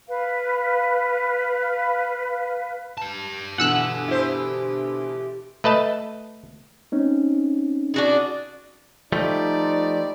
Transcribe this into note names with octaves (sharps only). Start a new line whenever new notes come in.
B4 F5
G4 A5
B2 D3 E3 F#5 E6 F#6
E4 C5
A3 B4 D#5 A5
C4 C#4 D#4
D4 F#4 G#4
F3 G3 A3 D#4 D5